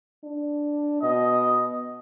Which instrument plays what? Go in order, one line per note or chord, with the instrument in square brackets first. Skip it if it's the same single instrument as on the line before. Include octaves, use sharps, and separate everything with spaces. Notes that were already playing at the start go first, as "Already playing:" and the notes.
[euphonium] D4
[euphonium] B2 [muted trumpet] D#5